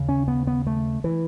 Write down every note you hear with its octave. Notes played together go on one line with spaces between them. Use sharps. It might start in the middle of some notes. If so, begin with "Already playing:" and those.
Already playing: D#2 C#3
C#4
B3
B3
A3
E3